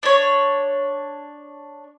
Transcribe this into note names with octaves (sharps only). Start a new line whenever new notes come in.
D4 C#5